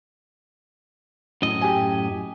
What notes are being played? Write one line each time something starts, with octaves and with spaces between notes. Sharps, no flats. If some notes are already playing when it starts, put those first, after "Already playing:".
F#2 A2 D#5
G4 G#5